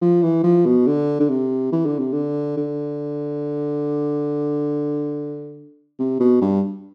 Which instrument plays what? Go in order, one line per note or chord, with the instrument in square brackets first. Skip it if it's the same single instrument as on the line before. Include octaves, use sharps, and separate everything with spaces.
[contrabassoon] F3
E3
F3
B2
D3
D3
C3
E3
D3
C3
D3
D3
C3
B2
G2